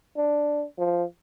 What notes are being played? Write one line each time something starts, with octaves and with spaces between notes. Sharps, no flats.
D4
F3